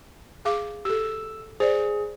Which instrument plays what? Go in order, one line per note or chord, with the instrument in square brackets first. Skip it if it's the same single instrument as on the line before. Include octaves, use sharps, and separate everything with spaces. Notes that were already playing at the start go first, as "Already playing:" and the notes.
[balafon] G#4 F5 D6
[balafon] G4 A4 [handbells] E6
[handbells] G#4 [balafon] C5 D5